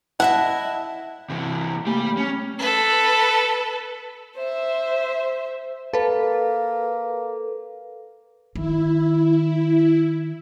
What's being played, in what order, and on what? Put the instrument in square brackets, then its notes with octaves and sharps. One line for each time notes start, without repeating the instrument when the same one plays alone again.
[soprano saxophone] E4 [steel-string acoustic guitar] D#5 E5 A5 [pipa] F#5
[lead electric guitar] C3 E3
[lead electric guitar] G3 G4 [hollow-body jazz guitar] A3 A#3 G#5
[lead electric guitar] C#4
[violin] A4 B4
C5 E5
[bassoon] A#3 [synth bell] A4 B4
[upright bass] D#3 [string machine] E4